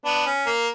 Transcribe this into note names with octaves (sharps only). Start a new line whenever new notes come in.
B3 D4
C#4
A#3